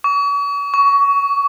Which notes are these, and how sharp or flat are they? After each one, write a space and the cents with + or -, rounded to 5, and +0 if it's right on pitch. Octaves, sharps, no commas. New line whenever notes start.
C#6 +40
C#6 +20